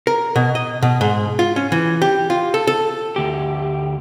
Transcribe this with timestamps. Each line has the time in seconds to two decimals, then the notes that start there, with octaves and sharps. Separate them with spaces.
0.07 A#4
0.36 B2
0.55 D#5
0.82 B2
1.01 G#2
1.39 F4
1.56 C#4
1.72 E3
2.02 G4
2.30 F4
2.54 A4
2.67 A4
3.16 D2 G4